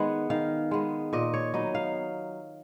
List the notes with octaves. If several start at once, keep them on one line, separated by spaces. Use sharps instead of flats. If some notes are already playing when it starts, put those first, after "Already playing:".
Already playing: D#3 G#3 B3 F#5
D#3 F5
G#3 B3
A#2 D#5
C#5
F#3 B3 D#4 D#5
F5